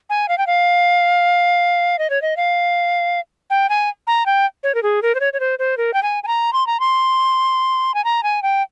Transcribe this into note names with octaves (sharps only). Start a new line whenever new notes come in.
G#5
F5
G5
F5
D#5
C#5
D#5
F5
G5
G#5
A#5
G5
C#5
A#4
G#4
A#4
C5
C#5
C#5
C5
C5
A#4
G5
G#5
G#5
A#5
C6
A#5
C6
G#5
A#5
G#5
G5